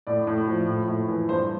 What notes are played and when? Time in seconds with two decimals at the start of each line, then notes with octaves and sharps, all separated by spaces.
0.07 A2 D5
0.27 A2
0.47 F3
0.67 A2
0.88 A2
1.08 E3
1.28 G2 C5